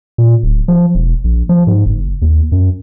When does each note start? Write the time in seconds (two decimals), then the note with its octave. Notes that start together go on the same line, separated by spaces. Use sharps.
0.18 A#2
0.43 D1
0.68 F3
0.95 E1
1.24 A#1
1.49 F3
1.67 G#2
1.86 F#1
2.22 D#2
2.52 F#2